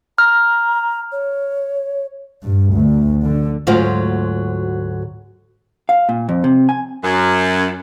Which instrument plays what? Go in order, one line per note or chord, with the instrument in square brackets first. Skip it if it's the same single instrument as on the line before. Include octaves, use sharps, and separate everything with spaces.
[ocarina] A#5 [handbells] F6
[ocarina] C#5
[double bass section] G2
D2
D3
[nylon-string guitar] D2 G#2 F#3 F4 F#4 C5
[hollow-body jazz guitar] F5
A#2
F2
C3
G#5
[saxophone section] F#2